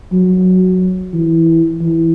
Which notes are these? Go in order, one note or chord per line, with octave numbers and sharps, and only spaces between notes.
F#3
E3
E3